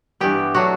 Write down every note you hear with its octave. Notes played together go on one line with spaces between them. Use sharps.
G2 E3 B3 G4
F#3 A3 D4 F#4